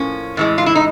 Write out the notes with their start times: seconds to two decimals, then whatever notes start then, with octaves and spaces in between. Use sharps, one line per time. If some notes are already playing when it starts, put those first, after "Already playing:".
Already playing: A2 F3 A#3 C#4
0.37 A2 E3 G#3
0.58 F4
0.66 E4
0.75 D#4